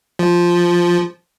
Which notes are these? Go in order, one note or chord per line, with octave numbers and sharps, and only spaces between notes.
F3